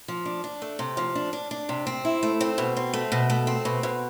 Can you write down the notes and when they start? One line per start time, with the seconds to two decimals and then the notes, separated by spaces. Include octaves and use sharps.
0.08 F3
0.26 D4
0.44 D4
0.62 A3
0.79 C3
0.97 F3
1.15 D4
1.33 D4
1.51 D4
1.69 C3
1.87 C4
2.05 E4
2.23 A3
2.41 C4
2.58 B2
2.77 C4
2.94 A3
3.12 B2
3.30 A3
3.47 C4
3.65 B2
3.83 B2